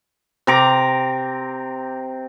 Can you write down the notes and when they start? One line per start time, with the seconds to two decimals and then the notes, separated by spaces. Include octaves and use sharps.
0.47 C3 A#5 D6